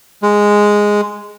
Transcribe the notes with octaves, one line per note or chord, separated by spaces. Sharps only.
G#3